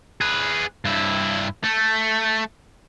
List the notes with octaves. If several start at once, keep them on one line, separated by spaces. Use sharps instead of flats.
G#4 B4
G2 E4
A3